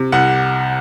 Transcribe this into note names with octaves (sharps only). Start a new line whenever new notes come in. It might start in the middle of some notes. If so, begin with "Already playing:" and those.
Already playing: C3
C2 F#5